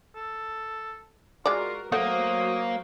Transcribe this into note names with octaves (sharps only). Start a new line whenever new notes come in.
A4
G#3 F4 F#4 A#4 D5
F#3 A3 A#3 C5 C#5 F#5 D#6